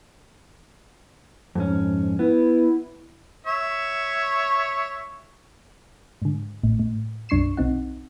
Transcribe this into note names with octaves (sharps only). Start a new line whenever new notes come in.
F2 G#2 C#4
B3 E4
C#5 E5 C#6
G#2 D3
A1 A2
A2
B1 F#2 D4 C#6 C7 E7
B1 C4 D#4 F#5